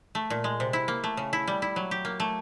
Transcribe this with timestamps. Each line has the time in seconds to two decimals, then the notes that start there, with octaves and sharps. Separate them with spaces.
0.15 A3
0.30 A#2
0.44 G#3
0.60 C3
0.73 E4
0.88 A#3
1.04 A3
1.17 C#3
1.33 E4
1.48 G3
1.62 E4
1.76 F#3
1.91 G4
2.05 A#3
2.20 A3